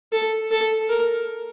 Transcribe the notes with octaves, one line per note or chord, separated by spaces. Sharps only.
A4
A4
A#4